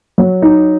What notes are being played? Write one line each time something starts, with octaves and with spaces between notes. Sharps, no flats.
F#3
D#4